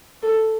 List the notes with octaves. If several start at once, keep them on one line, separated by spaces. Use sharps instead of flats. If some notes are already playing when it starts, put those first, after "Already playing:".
A4